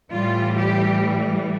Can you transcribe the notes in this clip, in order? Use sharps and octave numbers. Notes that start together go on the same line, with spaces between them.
A2 E3 G3 F4
G4